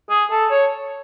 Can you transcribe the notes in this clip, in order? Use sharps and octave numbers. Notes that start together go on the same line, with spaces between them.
G#4
A4
C#5